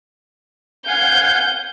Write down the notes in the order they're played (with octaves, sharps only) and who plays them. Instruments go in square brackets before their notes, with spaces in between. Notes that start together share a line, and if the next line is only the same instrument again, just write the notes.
[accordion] F5 F#5 G#5 [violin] G6